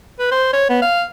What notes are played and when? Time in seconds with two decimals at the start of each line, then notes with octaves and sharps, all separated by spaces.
0.20 B4
0.31 C5
0.53 C#5
0.70 B3
0.82 F5